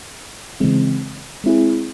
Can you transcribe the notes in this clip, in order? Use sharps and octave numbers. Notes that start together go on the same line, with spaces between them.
C#3 E3 G#3 C4
G#3 C4 E4 G#4